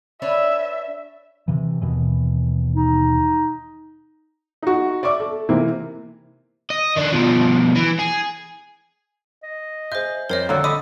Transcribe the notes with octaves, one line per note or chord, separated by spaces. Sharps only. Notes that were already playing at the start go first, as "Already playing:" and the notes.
D4 B4 C#5 E5
C3 E3
D#2 B2 E3
D#4
D#4 F#4
D5 E5 C#6 D6
A4
C3 E3 A#3
D#5
D#3 D4
B2 F3
E3
G#4
D#5
G#4 C5 E5 G6
F2 A#4 C5 C#5 D#5
A#1 D3 F#3 A#3 A4
D#5 B5 D6 D#6